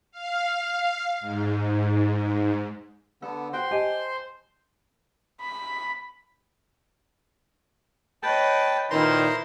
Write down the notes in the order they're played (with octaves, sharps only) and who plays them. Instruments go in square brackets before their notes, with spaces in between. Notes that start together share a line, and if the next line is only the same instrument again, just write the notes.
[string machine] F5
G#2
[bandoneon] D3 B3 [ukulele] A4
[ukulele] F#4 G5 [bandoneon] C5 C6
[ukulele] G4 G#5 A5 [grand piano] D#5
[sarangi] B5
[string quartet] B4 C#5 D#5 [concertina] G5 A5
[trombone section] A#2 D#3 [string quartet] E4 B4 [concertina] C5 A#5 C6